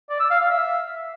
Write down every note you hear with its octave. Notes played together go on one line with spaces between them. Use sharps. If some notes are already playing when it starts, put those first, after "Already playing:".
D5
E6
F5
F5
E5